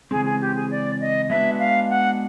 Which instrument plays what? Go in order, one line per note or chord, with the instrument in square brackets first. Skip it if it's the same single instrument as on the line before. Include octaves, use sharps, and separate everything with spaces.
[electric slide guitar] C#3 E3 G#3 C4 [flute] G#4
[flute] G#4
G4
G#4
D5
D#5
[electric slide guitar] G#3 B3 D4 F#4 B4 [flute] E5
[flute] F5
F#5